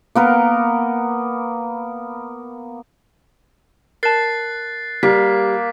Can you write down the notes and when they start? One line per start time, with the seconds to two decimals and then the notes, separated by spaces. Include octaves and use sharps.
0.15 A#3 B3 A#4
4.03 A#4 A5 F#6 A6 C7
5.03 G3 A#3 B6